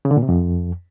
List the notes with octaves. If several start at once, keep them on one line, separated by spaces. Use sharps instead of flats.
C#3
D3
A#2
C3
F2